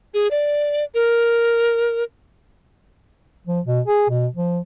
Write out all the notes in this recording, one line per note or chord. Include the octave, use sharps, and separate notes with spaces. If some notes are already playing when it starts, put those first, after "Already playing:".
G#4
D5
A#4
F3
B2
G#4
B2
F3